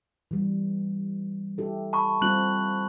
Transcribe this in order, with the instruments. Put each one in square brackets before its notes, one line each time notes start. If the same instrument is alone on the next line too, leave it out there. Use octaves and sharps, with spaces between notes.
[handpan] E3 G3
E4 G4 A4
[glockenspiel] A5 B5 C#6
[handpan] G3 C4 F4 [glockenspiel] F#6 F#7